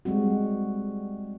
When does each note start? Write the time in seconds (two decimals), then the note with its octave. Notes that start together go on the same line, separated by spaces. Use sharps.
0.05 G3 G#3 C4 F#4